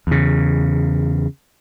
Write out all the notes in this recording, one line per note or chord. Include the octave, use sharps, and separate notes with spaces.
E2 C#3